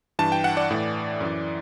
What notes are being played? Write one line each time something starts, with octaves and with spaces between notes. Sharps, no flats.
G2 E3 A5
G5
F#5
D5
A2 E3
F#2 E3